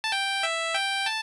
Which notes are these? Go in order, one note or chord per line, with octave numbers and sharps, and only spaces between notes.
A5
G5
E5
G5
A5